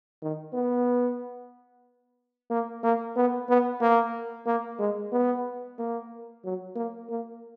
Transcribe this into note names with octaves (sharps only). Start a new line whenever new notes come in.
D#3
B3
A#3
A#3
B3
B3
A#3
A#3
G#3
B3
A#3
F#3
A#3
A#3